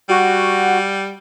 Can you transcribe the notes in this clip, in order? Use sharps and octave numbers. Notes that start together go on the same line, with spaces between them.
G3 F#4